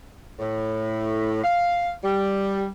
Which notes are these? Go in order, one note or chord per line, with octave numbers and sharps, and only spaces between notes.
A2
F5
G3